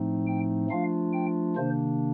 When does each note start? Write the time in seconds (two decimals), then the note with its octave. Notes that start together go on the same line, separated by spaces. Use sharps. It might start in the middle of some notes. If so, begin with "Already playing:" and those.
Already playing: A2 F3 A3 C4 D#4
0.27 G5
0.70 F3 A3 D4 F4 F5
1.13 G5
1.56 C3 D#3 A#3 D4 C5